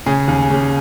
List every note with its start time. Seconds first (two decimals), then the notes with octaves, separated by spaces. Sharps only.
0.06 C#3 G#4
0.28 D#2
0.50 C#3